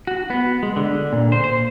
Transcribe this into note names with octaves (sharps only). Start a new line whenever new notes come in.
F#4
B3
G#3
D3
A#2
C5
C5